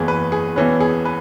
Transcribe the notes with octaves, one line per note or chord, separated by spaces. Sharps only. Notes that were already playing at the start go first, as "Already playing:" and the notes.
Already playing: F#1 E2 E3 G#4
B4
G#4
E1 E2 E3 C#4 B4
G#4
B4